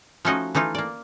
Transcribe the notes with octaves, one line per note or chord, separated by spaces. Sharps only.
F3 A3 C#4 D#4 F#4 D#5
E3 A3 D#4 F4
A#3 D5